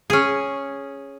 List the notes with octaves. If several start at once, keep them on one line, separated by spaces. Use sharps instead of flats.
C#4 G#4